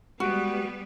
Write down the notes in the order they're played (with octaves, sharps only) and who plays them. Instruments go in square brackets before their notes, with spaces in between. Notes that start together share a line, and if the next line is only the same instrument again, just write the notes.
[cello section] G3 B3 B4 [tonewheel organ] G#3 G4 [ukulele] F#4